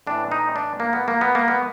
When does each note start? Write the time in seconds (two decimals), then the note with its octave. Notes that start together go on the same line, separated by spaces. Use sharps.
0.07 A2 E3 D4
0.32 D#4
0.56 D4
0.80 A#3
0.93 B3
1.08 A#3
1.21 B3
1.35 A#3
1.48 B3